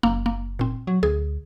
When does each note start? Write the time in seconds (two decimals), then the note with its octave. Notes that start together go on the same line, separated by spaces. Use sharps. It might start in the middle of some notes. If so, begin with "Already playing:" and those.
0.03 F#1 A#3
0.26 A#3
0.59 A#2 C4
0.87 F#3
1.03 D2 G#4